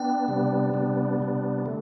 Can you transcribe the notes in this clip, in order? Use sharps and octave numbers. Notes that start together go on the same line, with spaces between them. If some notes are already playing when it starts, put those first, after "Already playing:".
Already playing: B3 D4 G5
C3 G3 B3 D4
C3 G3 B3 D4
C3 G3 B3 D4
D3 A3